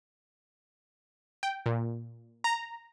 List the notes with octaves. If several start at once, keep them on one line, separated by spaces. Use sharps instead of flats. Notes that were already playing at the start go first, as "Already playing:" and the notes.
G5
A#2
A#5